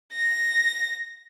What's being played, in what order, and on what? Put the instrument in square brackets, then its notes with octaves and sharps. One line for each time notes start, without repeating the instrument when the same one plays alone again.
[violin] A#6